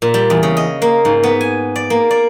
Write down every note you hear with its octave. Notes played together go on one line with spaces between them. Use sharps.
A#2
G3
E2
C#3
D#5
A#3
G#2
B3
G#5
D5
A#3
D5